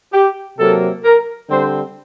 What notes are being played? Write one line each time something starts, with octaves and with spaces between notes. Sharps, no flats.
G4
C3 F#3 A#3 A4
A#4
D3 G3 C4 C5